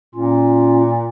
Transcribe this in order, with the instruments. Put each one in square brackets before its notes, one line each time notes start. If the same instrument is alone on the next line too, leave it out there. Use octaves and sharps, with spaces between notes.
[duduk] A#2 [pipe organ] C#4 F4